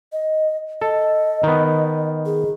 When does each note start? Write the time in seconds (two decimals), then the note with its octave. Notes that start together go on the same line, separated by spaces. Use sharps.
0.12 D#5
0.81 A4 D#5
1.43 D#3 B3
2.26 G#4